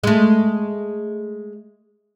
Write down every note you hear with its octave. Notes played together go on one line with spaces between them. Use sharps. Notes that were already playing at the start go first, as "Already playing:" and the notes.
G#3 A3